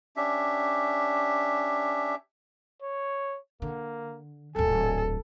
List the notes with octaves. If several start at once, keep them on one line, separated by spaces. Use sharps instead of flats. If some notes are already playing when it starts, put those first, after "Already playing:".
C#4 D4 G4 E5
C#5
D3 A#3
D1 G#1 A4 G#5